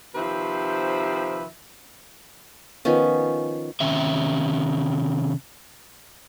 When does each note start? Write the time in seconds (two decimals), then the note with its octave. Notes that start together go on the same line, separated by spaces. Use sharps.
0.15 C3 D#3 F3 B4 C5 E5
2.85 D#3 F3 B3 C#4
3.81 C3 D#3 C#4 E5